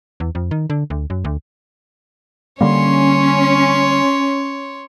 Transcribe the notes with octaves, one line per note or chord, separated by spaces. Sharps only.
E2
F2
D#3
D3
D2
F#2
D2
D3 G3 A#3 C#4 C#5 C6